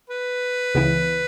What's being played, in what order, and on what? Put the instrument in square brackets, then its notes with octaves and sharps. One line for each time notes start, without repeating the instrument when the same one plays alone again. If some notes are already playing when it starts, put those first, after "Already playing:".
[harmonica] B4
[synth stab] C#2 C#3 E3 B3 E4